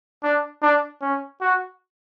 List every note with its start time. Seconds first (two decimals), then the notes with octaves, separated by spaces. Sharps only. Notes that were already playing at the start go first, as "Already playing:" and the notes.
0.23 D4
0.62 D4
1.02 C#4
1.41 F#4